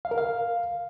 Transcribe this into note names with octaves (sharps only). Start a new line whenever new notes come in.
F5
A#4
F5